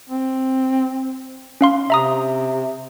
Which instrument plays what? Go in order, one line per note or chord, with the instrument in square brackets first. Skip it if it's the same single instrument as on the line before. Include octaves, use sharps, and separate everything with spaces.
[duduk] C4
[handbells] C#4 F5 C6
[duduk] C3 [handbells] E5 A#5 D#6